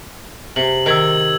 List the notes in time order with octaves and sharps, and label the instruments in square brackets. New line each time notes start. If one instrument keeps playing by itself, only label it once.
[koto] C3 [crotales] F#7
[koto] D#3 [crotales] E6 G#6 F#7